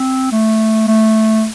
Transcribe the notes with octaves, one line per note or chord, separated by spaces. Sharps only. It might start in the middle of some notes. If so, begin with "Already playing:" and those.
Already playing: C4
A3
A3